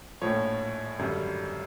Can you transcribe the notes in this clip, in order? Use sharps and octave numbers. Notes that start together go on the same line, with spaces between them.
A#1 A2 F3 C#5
G#1 F#2 D3 G3